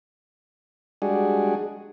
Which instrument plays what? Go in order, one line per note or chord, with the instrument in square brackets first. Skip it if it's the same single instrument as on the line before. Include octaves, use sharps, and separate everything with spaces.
[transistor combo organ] G3 G#3 D4 F#4 G#4